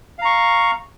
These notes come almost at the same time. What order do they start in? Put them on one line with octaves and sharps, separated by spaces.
F5 A#5 C#6